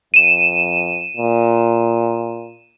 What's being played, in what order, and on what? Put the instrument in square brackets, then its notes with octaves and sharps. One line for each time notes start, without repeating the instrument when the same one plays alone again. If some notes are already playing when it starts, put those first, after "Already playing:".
[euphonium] F2 [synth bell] D#7 E7
[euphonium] A#2